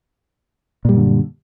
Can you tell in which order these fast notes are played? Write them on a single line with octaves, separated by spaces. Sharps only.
A#2 G3 F#2 D3